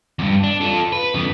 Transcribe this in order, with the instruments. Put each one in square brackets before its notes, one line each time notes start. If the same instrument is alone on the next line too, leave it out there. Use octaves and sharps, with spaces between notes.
[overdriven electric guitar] E2 G2
D4
F4 A4
B4
F2 D3